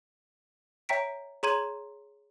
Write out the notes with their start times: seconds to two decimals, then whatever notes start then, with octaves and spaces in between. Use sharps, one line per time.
0.89 C#5 E5 G5 A#5 B6 D7
1.43 G#4 C#5 A#5 C6 G#6 D#7